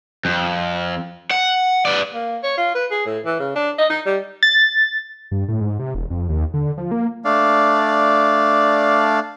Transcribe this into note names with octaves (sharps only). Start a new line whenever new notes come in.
F2
F#5
B4 D5
A#3
C#5
F4
B4
G#4
A2
E3
C#3
D4
D#5
D#4
G3
A6
G2
A2
G#2
C3
E1
F2
D#2
D3
F3
A#3
A3 D4 D5 F5